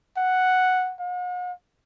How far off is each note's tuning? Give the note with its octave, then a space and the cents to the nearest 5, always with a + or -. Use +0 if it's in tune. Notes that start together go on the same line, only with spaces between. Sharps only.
F#5 +0
F#5 -45